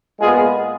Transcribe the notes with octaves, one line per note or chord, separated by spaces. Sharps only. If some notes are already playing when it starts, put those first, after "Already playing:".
A#2 G#3 B3 F4 G#4